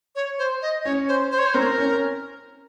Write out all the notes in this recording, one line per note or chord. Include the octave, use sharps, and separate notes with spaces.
C#5
C5
D#5
C#4 C#5
C5
C5
C#5
C5
C4 A#4
C#4